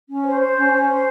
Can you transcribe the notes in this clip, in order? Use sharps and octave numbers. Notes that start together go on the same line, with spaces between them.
C#4
C5
C5
C#4
C#4
C5